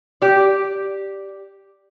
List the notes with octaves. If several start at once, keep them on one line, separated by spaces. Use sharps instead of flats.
G4 D5